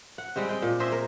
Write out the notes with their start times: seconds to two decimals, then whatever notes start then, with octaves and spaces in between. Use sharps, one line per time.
0.18 F#5
0.36 G3 G#3 C4
0.49 G#3 G5
0.62 A#2
0.80 G#4 C5 D#5 E5
0.92 A#4